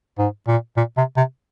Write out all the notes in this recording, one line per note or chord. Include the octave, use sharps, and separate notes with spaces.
G#2
A#2
A#2
C3
C3